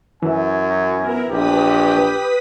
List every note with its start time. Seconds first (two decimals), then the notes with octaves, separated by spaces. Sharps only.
0.23 F#2 E3 G#5
0.96 B3 E4 A#4
1.29 A#1 G4 B4 D#6 B6